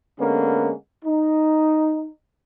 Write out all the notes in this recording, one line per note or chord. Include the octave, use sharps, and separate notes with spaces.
D3 G#3 A#3 B3 C#4
D#4